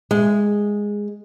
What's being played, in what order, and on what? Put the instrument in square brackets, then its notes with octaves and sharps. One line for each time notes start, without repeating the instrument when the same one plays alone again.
[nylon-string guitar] G#3